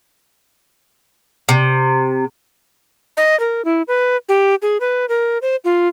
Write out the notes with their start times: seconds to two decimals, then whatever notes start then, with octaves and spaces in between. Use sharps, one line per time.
1.49 C3
3.17 D#5
3.40 A#4
3.65 E4
3.88 B4
4.29 G4
4.62 G#4
4.81 B4
5.09 A#4
5.42 C5
5.65 F4